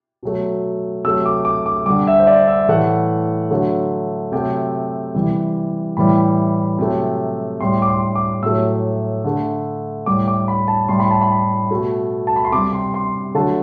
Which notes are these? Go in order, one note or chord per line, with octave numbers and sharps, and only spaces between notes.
B2 F#3 A3
C3 F#3 A3 E6
D6
D6
D6
D3 G3 D6
E5
C5
D5
E5
A2 E3 A3 F#5
D3 F#3 A3
C3 F#3 A3 G5
C3 E3 G3
A2 E3 G3 B5
C3 F#3 A3
A2 G3 C6
D6
C6
D6
A2 F#3 A3 E6
D3 A3
A2 G3 D6
D6
B5
A5
A2 G3 C6
B5
A5
B5
B2 A3
A5
B5
C6
C3 G3 D6
C6
C6
D3 F#3 A3 A5